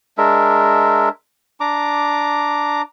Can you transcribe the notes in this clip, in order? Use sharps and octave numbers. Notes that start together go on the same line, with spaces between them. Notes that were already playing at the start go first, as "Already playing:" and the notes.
G#3 D4 A#4 E5
D4 A#5 D6